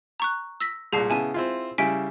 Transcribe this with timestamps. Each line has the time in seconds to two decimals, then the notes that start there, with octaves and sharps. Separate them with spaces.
0.20 A#5 C#6 F#6
0.61 E6 A#6 B6
0.93 C2 A#2 G#4 A5 C7
1.10 C#3 B3 E4 G#5 A5 D#7
1.34 C4 E4 F4
1.78 C#3 G3 E4 G#5 B6 D7